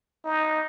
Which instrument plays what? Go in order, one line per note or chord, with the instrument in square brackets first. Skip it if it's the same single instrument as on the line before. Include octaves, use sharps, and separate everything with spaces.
[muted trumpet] D#4